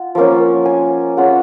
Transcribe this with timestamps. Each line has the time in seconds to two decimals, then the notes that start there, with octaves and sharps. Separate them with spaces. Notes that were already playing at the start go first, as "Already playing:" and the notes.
Already playing: F4 F#5
0.15 F3 A#3 C#4
0.66 G#5
1.17 G#3 C#4 F4 F#5